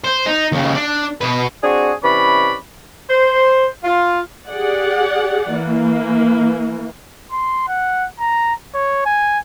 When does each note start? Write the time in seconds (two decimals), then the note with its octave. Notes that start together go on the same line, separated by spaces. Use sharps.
0.04 C5
0.26 D#4
0.52 D#2 C#3
0.75 D4
1.21 B2 B4
1.63 C4 D4 F#4 G#4
2.04 C3 E3 C#4 B4 D5 B5
3.09 C5
3.84 F4
4.48 G4 G#4 D5 F#5
5.52 E3 A#3
7.31 C6
7.68 F#5
8.19 A#5
8.74 C#5
9.06 G#5